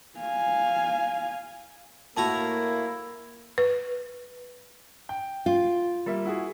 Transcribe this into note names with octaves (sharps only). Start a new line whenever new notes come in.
F5 G#5
A2 A#3 E4 F#4 A5 A#5
B4
G5
F4
G3 A#3 E5
E4 F#4 G#4